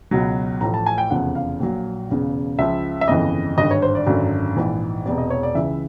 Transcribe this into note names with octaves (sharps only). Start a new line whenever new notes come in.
C#2 B2 F#3
A1 A2 F3 A#5
A5
G#5
G5
F1 E2 C#3 F3 F#5
F5
A#1 A#2 F#3
E1 E2 C#3
C#2 C#3 F3 E5
E5
G1 F2 C#3 E3 D#5
G#1 G2 D3 D#5
C#5
C5
D5
G#1 F#2 D3 F#3
A#1 G#2 E3
E1 E2 C3 D5
D#5
C#5
D5
C#2 C#3 E3 E5